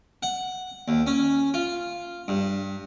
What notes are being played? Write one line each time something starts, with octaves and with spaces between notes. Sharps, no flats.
F#5
D#2
C#4
F4
G2